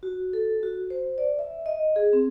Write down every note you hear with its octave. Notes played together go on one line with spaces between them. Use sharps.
F#4
A4
F#4
C5
D5
E5
D#5
G#4
C4